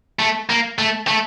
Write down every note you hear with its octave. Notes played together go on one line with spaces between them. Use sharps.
A3
A#3
A3
A3